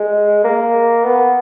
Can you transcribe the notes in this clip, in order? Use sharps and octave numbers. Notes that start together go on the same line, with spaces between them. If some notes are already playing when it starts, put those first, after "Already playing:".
Already playing: G#3
A#3
B3